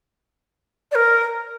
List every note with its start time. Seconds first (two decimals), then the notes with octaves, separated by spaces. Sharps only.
0.91 D5
0.95 A#4